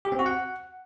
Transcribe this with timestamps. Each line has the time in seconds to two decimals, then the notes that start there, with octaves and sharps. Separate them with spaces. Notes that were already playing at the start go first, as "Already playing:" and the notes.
0.05 G4
0.12 C4
0.19 F#4
0.26 F#5